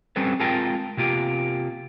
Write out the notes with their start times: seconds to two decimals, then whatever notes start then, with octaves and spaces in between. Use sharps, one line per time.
0.16 G3 C4 C#4 A4 B4
0.40 G#3 C4 F4 A#4 G5 A5
0.97 C3 A#3 F4 G4